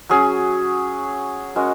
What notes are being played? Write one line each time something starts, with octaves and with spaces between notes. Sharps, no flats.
F#3 C#4 G#4
G#3 C#4 F#4 A#4